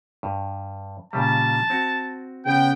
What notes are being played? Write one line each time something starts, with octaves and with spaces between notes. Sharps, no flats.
G2
A#2 C#3 G3 A5
C4 F#4
C#3 B3 G5